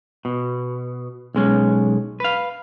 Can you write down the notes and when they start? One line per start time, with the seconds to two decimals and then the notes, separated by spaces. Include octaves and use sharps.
0.25 B2
1.35 B1 G#3 C#4
2.20 B4 F5